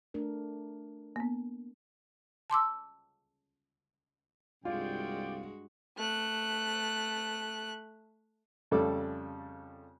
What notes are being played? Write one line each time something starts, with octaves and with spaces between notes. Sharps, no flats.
A3 D4 A#4
A#3 B3
A5 C6 D6 E6
C2 G2 G#3 F4 F#4 D5 G5
A3 F#6
F2 C#3 G3 A3 A4 D6